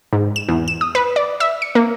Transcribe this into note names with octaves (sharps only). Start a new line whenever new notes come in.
G#2
E7
E2
E7
D#6
B4
D5
E5
C#7
A#3